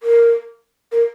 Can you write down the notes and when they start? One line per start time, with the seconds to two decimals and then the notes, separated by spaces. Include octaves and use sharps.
0.03 A#4
0.92 A#4